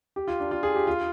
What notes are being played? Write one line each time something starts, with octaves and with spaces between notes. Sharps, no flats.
G4
F4
D4
F4
G#4
G4
F4